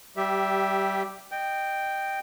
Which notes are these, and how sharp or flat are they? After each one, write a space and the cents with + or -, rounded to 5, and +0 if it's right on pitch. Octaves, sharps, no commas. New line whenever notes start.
G3 -20 G4 +0 E5 +0
D#5 -25 G5 +0